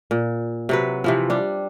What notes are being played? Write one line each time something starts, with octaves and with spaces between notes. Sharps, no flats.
A#2
C3 F#3 B4
C3 E3 F3
G3 D4